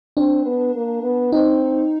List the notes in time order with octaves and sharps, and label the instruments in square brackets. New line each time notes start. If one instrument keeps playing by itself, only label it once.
[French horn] C4 [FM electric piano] D4
[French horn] B3
A#3
B3
[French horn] C4 [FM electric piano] D#4